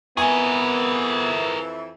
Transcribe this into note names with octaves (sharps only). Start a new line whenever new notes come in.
F2 E3 B3 G#4 A#4 G#5 C#6